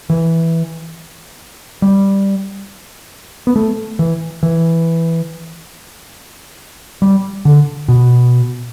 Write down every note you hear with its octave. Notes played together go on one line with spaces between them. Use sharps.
E3
G3
B3
A3
E3
E3
G3
D3
B2